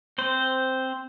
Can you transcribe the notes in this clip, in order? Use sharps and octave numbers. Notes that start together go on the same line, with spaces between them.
C4 C5